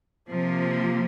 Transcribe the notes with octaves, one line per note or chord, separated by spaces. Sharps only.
C3 F3 A#3